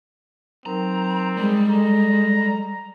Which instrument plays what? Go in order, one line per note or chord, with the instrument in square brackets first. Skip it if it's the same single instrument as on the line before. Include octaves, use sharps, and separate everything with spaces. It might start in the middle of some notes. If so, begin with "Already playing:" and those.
[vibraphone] F#3 D#4 A#4 [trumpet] C4 [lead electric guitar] A#5
[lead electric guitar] G3 [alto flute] G#3 [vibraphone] C6
[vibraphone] A4 [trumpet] A#5